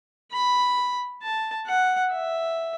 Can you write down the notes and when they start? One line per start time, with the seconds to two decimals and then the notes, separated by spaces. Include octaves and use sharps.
0.32 B5
1.22 A5
1.67 F#5
2.12 E5